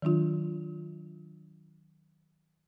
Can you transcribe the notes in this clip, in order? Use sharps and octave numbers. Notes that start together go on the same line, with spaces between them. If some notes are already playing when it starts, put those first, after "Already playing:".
D#3 F#3 D4 F4